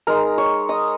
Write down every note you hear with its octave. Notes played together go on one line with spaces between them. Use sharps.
G#3 D#4 A#4 A#5
C#5 C#6
D#5 D#6